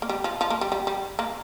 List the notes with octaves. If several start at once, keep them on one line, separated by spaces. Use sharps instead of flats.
A#3
G3
F3
F3
A#3
G3
G3
G3
A#3